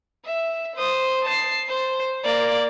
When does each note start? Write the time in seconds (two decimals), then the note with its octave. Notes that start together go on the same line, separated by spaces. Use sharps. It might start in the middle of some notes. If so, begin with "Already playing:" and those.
0.25 E5
0.76 C5 D#6
1.25 A5 C7
1.68 C5
2.24 A#3 D5